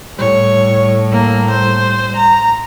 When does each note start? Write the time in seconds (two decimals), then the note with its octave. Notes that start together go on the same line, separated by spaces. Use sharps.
0.18 A2 G3 C#5
1.11 A#3
1.50 C5
2.16 A#5